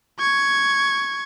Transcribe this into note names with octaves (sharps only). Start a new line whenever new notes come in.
C#6 G#6